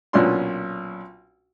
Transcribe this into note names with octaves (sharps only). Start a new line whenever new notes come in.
B1 A#2 C#4 D4 C6